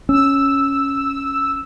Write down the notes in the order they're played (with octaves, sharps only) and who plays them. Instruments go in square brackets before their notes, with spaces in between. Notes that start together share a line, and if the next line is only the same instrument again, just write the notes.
[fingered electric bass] C#4 [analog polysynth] E6